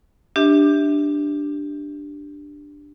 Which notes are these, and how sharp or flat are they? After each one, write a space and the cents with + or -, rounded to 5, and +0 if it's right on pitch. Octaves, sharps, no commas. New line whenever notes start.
D4 +0 G4 +0 E5 -20